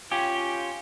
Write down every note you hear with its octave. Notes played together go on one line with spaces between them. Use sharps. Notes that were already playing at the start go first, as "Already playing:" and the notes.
C#4 F4 G4